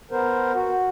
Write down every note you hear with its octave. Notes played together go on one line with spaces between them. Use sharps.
B3 A#4 C5
F#4